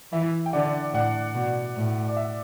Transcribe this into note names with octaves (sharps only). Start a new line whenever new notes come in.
E3 E5
G5
D3 D5 F#5
A2 D5 F#5
B2
A2
D5
E5